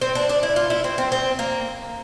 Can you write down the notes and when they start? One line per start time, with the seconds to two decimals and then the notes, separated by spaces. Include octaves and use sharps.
0.01 C4
0.15 D4
0.29 D4
0.43 E4
0.56 F4
0.70 E4
0.84 C4
0.98 C4
1.12 C4
1.39 A#3